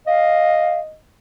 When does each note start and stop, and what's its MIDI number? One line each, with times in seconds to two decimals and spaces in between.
0.07 0.96 75
0.07 0.79 77